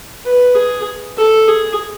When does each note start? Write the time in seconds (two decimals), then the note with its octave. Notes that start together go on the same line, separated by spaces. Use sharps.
0.25 B4
0.55 G#4
1.17 A4
1.47 G#4